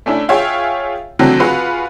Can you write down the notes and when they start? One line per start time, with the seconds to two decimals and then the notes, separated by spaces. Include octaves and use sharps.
0.06 A3 C#4 D4 E4
0.29 F4 G#4 C#5 E5 F5 G5
1.19 D3 E3 F#3 A3 C4
1.40 F4 F#4 G#4 B4 F5 F#5